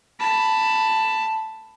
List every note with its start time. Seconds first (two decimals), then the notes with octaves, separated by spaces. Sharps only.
0.20 A5 B5